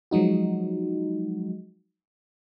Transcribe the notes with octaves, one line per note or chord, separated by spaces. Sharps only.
F3 F#3 G#3 D#4 F#4